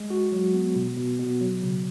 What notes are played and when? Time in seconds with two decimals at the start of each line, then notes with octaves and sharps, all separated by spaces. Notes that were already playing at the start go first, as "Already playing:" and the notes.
Already playing: G#3
0.10 F#4
0.32 F#3
0.54 B3
0.76 B2
0.97 B2
1.20 B2
1.41 F#3
1.62 C#3